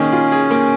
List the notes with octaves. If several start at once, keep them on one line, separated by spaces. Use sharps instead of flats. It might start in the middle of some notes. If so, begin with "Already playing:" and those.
Already playing: D#3 A#3 C#4 G#4
F4
G#4
A#3